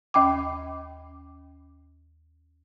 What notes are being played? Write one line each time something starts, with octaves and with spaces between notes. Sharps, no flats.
D#2 C#4 G5 D6